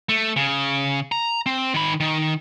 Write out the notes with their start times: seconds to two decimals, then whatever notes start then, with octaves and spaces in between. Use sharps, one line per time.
0.09 A3
0.36 C#3
1.12 A#5
1.46 C4
1.74 D#3 B5
2.00 D#3